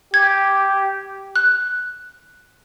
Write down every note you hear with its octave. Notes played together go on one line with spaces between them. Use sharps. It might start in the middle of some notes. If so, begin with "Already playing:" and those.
G4 G#6
F#6